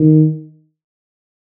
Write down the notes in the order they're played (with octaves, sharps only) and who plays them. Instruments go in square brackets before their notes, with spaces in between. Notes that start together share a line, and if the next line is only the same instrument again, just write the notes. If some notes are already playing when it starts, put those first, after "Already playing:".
Already playing: [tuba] D#3